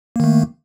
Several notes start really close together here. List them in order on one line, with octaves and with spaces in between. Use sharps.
A#3 D#3 A3